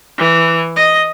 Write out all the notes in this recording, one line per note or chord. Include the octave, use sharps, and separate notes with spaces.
E3
D#5